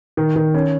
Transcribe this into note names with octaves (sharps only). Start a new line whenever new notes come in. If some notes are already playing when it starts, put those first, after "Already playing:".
D#3
D#3
C#4